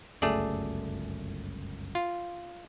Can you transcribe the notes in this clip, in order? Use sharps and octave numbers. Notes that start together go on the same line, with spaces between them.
G1 C#2 F#2 A3 G#4 D5
F4